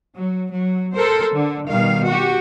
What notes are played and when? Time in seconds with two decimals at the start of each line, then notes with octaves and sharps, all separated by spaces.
0.17 F#3
0.52 F#3
0.94 A4 A#4 C5
1.36 D3
1.69 B2 D#3 G3 F5
2.06 F#4 G4